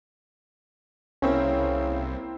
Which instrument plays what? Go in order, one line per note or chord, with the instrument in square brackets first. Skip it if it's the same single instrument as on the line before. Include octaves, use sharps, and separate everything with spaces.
[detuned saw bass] C2 [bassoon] C#3 [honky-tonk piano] A#3 C4 E4 [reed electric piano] C#4